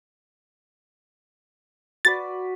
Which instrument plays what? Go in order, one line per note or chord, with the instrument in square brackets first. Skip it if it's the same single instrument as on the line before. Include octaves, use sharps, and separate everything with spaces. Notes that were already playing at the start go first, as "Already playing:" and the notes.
[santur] F#4 B4 D5 [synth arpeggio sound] A6